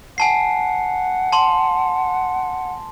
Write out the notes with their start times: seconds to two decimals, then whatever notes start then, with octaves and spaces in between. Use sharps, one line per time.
0.18 F#5 G#5 A5 C7
1.33 A5 C6